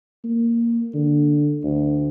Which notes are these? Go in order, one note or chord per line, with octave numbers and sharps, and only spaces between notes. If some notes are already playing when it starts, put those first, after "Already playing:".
A#3
D3
D2